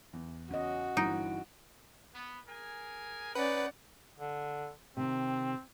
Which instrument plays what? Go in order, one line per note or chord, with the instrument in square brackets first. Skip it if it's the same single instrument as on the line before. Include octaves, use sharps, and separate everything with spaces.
[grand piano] E2
[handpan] C#4 D#5 [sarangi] F#4
[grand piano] G1 E3 D7 [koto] D#4
[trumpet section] B3
G#4 A#4 G#5
[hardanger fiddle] C#4 D5 [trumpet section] D#4 F#5 [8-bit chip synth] B4
[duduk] D3
[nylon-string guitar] C3 D#3 [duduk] C4